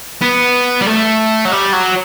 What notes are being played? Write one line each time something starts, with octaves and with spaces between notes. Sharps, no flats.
B3
G3
A3
F#3
G3
F#3